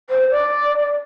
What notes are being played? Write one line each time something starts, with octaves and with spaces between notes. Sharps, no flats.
C5
D5